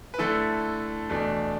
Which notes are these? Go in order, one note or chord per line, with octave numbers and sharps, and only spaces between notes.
B4
D3 A3 E4 A4
E2 B2 A3 D4